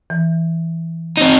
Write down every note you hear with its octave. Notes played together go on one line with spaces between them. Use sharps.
E3
C4 D#4